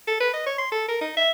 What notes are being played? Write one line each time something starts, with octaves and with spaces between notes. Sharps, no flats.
A4
B4
D#5
C#5
C6
A4
A#4
D#4
E5